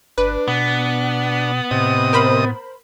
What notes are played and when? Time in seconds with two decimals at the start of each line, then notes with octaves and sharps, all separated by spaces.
0.18 G1 D4 B4
0.48 B2 B3
1.71 A2 C3 D#5 D#6
2.13 A#4 C5 B5